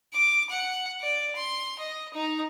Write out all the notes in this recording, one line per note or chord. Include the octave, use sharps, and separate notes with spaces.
D6
F#5
D5
C6
D#5
D#4